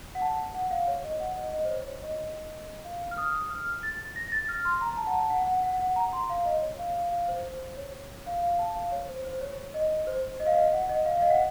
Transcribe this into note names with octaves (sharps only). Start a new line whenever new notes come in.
F#5
A5
F#5
F5
C#5
D#5
F#5
D#5
D#5
C5
C#5
C#5
D#5
F5
F6
D#6
F6
A6
A#6
A#6
A6
F6
C6
A#5
A#5
A5
F#5
A5
F#5
F#5
F#5
F#5
A#5
C6
F5
D#5
C#5
F5
F5
F5
C5
C5
C#5
F5
F5
A5
F5
C#5
C5
C5
C#5
D#5
C5
D#5
F5
D#5
F#5
D#5
F5
F5
D#5
F#5